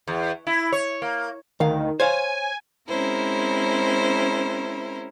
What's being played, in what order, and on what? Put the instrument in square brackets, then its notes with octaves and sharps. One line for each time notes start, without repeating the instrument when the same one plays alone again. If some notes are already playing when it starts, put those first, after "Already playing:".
[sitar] E2
E4
C#5
A#3
[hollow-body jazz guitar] D2 F5 [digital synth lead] D#3
[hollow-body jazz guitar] C5 C#5 F5 [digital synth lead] G#5
[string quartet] G#3 C4 C#4 E4 A#4 C5